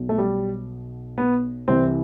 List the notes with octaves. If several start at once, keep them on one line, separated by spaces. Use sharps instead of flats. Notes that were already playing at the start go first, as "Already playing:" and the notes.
Already playing: B1 B2
A3
G3
B3
C2 C3 E3 C4